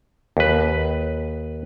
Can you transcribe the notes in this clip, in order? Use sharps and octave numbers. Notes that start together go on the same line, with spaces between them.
D#2 B4